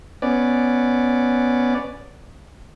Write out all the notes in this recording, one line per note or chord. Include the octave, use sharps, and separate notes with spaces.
B3 C#4 D5